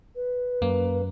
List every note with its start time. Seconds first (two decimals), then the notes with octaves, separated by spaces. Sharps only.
0.16 B4
0.62 F#2 A#3